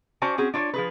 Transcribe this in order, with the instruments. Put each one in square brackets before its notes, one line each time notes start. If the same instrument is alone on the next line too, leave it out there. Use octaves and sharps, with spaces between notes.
[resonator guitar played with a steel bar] C#4 F#4 C5 D5 G#5 A5
C4 C#4 F#4 G#4
D4 F4 C#5 D5
F3 G#4 B4